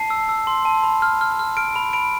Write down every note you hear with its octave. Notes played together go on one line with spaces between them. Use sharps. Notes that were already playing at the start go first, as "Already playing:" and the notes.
Already playing: A5 C7
E6
E6
C6
A5
B5
F6
F6
F6
F6 D7
B5
B5 D7